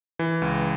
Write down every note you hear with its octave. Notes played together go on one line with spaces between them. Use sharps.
E3
C#2